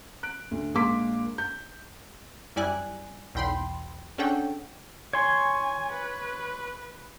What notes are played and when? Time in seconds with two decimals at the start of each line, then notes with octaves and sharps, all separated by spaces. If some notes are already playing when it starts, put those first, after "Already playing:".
0.23 F#6 D7
0.51 D2
0.74 A#1 G#3 A#3 C6 D6 B6
1.38 G6
2.56 F#2 G3 E4 D5 G#5 F#6
3.35 B1 E2 G5 B5 C6
4.18 C#4 D4 G#4 A4 F#5 G5
5.13 C#5 G#5 C6
5.93 B4